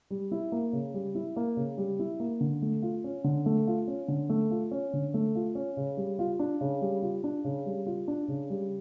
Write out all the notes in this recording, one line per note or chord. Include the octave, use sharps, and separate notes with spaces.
G3
E4
A#3
C#3
G3
E4
A#3
C#3
G3
E4
A#3
D3
A3
F4
C#4
D3
A3
F4
C#4
D3
A3
F4
C#4
D3
A3
F4
C#4
C#3
G3
F4
D4
C#3
G3
F4
D4
C#3
G3
F4
D4
C#3
G3